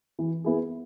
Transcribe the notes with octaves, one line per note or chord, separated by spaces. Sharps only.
E3
B3 E4 G#4